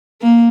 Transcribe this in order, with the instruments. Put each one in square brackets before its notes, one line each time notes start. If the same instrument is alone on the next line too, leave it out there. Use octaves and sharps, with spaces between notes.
[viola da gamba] A#3